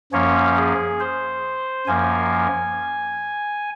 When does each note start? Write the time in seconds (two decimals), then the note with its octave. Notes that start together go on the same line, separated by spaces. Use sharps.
0.12 F#2 F3 A#3 C#4 C#5
0.57 G#4
1.00 C5
1.87 F#2 F3 A#3 G#5